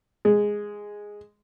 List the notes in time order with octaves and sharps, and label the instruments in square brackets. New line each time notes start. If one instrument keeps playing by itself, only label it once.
[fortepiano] G#3